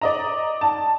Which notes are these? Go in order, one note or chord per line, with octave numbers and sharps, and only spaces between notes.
D5 D#5 A#5
A5